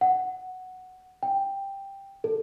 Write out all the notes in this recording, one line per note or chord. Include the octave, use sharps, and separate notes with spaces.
F#5
G5
A4